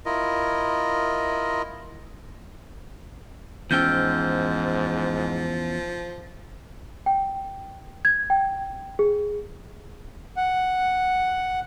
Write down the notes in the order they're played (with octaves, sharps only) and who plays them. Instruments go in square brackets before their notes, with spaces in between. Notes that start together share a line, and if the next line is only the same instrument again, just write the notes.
[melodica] E4 F4 A#4 D#5
[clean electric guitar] E2 C#4 G5 [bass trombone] G#2 [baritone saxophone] F3 [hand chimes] E6 F6 G6
[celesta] G5
G#6
G5
G#4
[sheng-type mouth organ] F#5